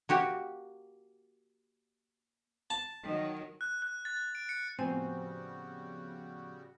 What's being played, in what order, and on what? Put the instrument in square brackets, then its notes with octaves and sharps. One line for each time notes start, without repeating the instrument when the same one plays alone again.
[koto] A#3 F#4 G4
[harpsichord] A5
[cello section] D#3 F#3
[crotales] F#6
F#6
A6
A6
D7
C#7
[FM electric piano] A2 F3 B3 [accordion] C#3 G3 F#4 [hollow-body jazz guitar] C4 [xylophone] G#5